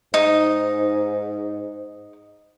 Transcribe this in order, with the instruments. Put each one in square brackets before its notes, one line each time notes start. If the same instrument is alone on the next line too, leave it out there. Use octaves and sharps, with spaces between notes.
[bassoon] G#2 [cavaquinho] D#4